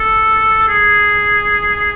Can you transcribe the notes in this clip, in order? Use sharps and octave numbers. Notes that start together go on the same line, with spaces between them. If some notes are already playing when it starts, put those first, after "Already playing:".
Already playing: A4
G#4